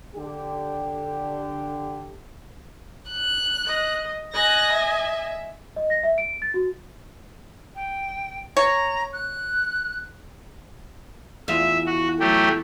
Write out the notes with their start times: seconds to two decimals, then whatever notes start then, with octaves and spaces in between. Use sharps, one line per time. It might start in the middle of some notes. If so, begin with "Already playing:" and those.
0.16 D3 G4
3.10 F#6
3.66 D#5
4.34 D#5 G#5 F#6 A#6
4.73 E5
5.76 D#5
5.90 A#6
6.03 E5
6.18 D7
6.42 A6
6.54 F#4
7.75 G5
8.57 C#5 A#5
9.13 F#6
11.48 E2 F4 E5
11.86 F#4
12.20 F#3 A3 G4